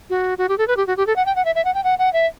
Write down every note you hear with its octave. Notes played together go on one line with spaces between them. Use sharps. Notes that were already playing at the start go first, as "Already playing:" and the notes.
F#4
F#4
G4
A4
B4
G4
F#4
G4
A4
F#5
G5
F#5
E5
E5
F#5
G5
F#5
F#5
E5